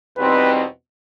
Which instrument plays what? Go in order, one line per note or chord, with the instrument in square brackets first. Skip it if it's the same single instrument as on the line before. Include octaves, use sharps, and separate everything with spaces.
[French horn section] E2 B2 G3 C4 D#4 [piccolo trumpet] B4